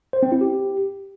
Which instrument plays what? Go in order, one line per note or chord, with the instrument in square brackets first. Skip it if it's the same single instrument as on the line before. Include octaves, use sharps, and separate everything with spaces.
[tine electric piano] C5
C4
E4
G4